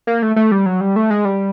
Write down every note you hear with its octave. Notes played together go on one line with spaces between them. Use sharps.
A#3
A3
A3
G3
F#3
G3
A3
G#3
G3